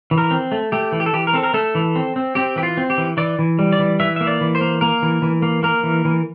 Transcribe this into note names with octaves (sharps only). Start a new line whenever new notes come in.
E3
A#4
C4
A3
A3 G4
E3
G4
A4
E3 G4
A#4
C4 A4
A#4
A3 A4
E3
C4
C4
C4 G4
E3 G4
F4
C4
G4
E3
E3 D5
E3
G3
D5
E3
E3 E5
A#3 E5
D5
E3
C5
A#3
A#3 A#4
E3
E3
A#3
A#3 A#4
E3
E3